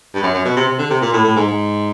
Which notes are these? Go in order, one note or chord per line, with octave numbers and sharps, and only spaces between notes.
G2
F#2
F#2
B2
C3
C3
D3
C3
A#2
A2
A2
G#2
G#2